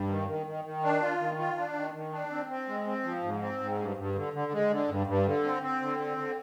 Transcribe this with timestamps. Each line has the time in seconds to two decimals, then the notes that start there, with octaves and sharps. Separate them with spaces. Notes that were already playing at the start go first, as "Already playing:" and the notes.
Already playing: G2
0.09 D#3
0.28 D#3
0.46 D#3
0.65 D#3
0.83 D4
1.02 F4
1.20 D#3
1.38 F4
1.57 D4
1.75 D#3
1.94 D#3
2.12 D4
2.30 C4
2.49 C4
2.67 G#3
2.86 C4
3.04 F3
3.23 G#2
3.41 C4
3.59 G#2
3.78 G2
3.97 G2
4.15 D3
4.33 D3
4.52 G#3
4.70 D3
4.89 G2
5.07 G2
5.26 D3
5.44 C4
5.63 C4
5.81 D3
5.99 C4
6.18 D3